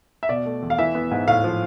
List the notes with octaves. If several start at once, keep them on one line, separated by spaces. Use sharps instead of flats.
E5
B2 D5
A3
E2
F5
E3 E5
B3
G#2
A2 F5
F3